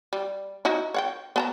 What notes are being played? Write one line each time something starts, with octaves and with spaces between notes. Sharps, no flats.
G3
D#4 E4 F#4
C#5 F#5 G5
B3 A5 A#5